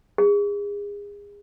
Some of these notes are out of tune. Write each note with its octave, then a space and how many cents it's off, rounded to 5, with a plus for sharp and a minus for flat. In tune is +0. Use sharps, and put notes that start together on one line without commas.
G#4 -30